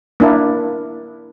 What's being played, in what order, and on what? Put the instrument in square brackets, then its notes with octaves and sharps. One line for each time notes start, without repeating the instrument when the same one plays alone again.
[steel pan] A#3 D4 E4